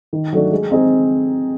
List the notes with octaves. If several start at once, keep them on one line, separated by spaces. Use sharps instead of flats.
D#3
F#3 A3 D4
G#3
C4 D#4 G#4